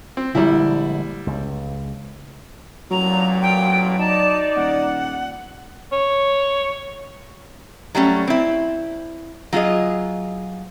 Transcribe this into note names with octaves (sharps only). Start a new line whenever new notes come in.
C4
A#1 D3 G3 G#3 E4
C#2
A1 A#2 F#3 A#5
G5
D#4 D5 A5
D#1 F#5
C#5
F#3 G3 A3 C#4
C4 E4
F#3 F4 G#4 D#5